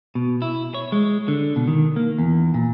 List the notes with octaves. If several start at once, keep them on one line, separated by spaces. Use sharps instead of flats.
B2
E4
C#5
G#3
D3
B2
D#3
A#3
E2
A#2